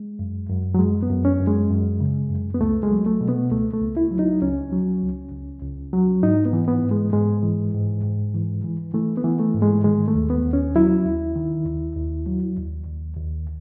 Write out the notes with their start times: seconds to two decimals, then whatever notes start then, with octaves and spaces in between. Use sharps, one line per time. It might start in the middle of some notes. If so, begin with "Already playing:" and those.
Already playing: G#3
0.19 F#2
0.49 F#2
0.75 F#3
0.79 F#2 G#3
1.03 B3
1.10 F#2
1.25 C#4
1.40 F#2
1.47 G#3
1.71 F#2
2.00 C#3
2.30 F#2
2.55 B3
2.60 C#2 A3
2.83 G#3
2.91 F#3
3.06 A3
3.21 B2
3.29 B3
3.51 C#2 A3
3.74 A3
3.81 C#2
3.97 E4
4.11 F#3
4.19 D#4
4.41 C#2 C#4
4.72 F#3
5.02 C#2
5.32 C#2
5.62 C#2
5.93 F#3
6.23 G#2 D#4
6.45 B3
6.53 E3
6.68 B3
6.83 G#2
6.91 G#3
7.13 G#2 G#3
7.43 E3
7.74 G#2
8.04 G#2
8.34 E3
8.64 E3
8.94 E3 A3
9.17 B3
9.24 E3
9.40 A3
9.55 G#2
9.62 G#3
9.84 D#3 G#3
10.08 A3
10.15 D#2
10.30 B3
10.45 D#2
10.53 C#4
10.76 F#3 E4
11.05 D#2
11.36 D#3
11.66 D#2
11.96 D#2
12.26 F#3
12.57 D#2
12.86 D#2
13.17 D#2